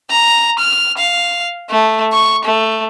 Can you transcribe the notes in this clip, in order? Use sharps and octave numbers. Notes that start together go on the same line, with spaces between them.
A#5
F6
F5
A3
C#6
A3